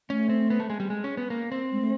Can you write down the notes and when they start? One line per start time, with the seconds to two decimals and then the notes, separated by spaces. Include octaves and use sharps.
0.10 A3 C#4
0.29 C4
0.50 B3
0.60 A3
0.70 G#3
0.80 G3
0.90 G#3
1.04 C#4
1.17 B3
1.30 A#3
1.52 C4
1.72 G#3
1.81 A3